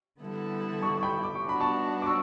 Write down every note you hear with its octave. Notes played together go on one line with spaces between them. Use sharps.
D3 G3 B3 E4 A4
A5 C#6
C#6
G5 B5
D6
C#6
G3 B3 D4 F#4 B5
A5 C#6
D6
C#6 E6